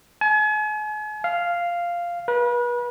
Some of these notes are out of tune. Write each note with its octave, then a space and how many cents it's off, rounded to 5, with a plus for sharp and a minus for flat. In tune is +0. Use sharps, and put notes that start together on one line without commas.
G#5 +40
F5 -5
B4 -35